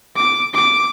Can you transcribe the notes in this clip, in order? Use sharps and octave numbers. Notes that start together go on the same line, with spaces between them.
D6
D6